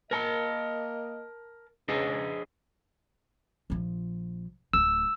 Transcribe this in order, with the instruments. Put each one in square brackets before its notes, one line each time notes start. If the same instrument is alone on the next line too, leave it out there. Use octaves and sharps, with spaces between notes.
[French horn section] A#3 D#5 [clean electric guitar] A#4 A5
[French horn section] C#3 [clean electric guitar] D4 G#4 D#5
[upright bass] A#1 F3
[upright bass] D1 D2 [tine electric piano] E6